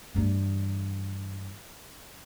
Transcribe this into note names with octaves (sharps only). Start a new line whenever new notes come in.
G2 E3